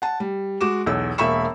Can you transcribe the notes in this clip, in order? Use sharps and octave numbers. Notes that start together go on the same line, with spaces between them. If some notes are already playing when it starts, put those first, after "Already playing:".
F#5 A5
G3
G#3 F#4 D6 E7
B1 E2 E6
E1 A#3 E5 B5 C#6 E7